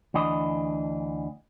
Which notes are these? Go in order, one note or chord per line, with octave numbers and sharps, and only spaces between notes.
D2 E3 D4 D#5